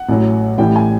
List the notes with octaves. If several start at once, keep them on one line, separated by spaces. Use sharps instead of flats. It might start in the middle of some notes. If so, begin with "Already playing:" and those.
Already playing: F#5
A1 A2 F#3
A1 A2 E3 G3 G5
G#5